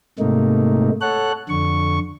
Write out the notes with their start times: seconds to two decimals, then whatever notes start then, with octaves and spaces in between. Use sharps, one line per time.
0.19 G#2 C3 A3 A#3 D#4
1.01 A4 C#5 F#5 F#6
1.49 F2 D3 C#6